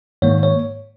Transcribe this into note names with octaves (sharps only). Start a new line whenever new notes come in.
G#2 D#3 A#3 C#5
C#5